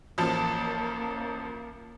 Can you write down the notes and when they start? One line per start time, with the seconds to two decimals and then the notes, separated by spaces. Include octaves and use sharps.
0.18 A1 F3 A#3 A5